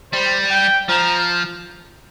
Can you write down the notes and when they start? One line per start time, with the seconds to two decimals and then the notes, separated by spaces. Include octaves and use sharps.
0.13 G3 C5
0.51 G5
0.89 F3 A#5